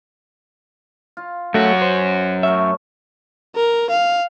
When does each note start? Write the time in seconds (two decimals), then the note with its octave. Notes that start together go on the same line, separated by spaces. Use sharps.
1.17 F4
1.54 F#2 F#3 A3 F#4
1.81 C5
2.43 A3 A#4 C#5 E5
3.55 A#4
3.90 F5